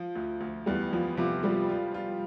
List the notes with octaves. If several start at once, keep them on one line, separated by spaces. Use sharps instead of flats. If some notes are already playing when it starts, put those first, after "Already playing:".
Already playing: F3
D2
D2
E2 G3
E2 F3
C3 F3
F3 G3
F4
F4